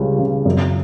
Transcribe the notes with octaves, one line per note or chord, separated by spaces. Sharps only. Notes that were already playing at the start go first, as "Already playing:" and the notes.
Already playing: C#2 C#3 G3
C#3
F#2